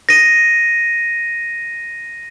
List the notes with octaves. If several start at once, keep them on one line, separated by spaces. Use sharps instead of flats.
A#6 D#7